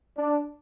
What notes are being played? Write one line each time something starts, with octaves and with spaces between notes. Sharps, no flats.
D4